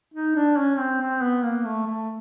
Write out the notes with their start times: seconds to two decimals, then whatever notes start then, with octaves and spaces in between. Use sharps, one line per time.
0.14 D#4
0.36 D4
0.57 C#4
0.79 C4
1.01 C4
1.22 B3
1.44 A#3
1.65 A3
1.86 A3